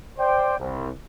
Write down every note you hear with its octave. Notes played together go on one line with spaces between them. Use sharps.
C5 D5 G5
C2